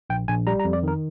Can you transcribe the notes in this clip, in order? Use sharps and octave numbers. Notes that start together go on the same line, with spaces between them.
A#1 G5
A#1 G#5
G3 A#5
A#5
F2
D5
D#3 A#4